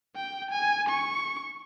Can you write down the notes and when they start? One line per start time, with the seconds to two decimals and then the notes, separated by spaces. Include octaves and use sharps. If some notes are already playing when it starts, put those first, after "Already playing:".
0.16 G5
0.51 G#5
0.89 C#6